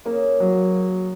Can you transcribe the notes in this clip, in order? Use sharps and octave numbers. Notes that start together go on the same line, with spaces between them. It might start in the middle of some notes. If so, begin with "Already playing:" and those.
C#3 A#3
F#3